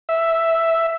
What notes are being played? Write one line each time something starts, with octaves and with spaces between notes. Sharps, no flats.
E5